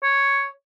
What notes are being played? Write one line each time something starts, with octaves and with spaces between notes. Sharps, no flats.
C#5